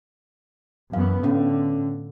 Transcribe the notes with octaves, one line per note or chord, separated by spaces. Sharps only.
F#2 E3 B3 F5
A2 D3 B3 C#4